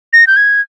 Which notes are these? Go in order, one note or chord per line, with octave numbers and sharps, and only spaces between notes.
A#6
G6
G#6